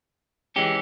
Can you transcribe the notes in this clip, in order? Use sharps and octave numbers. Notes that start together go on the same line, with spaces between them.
E3 G#3 C#4 G4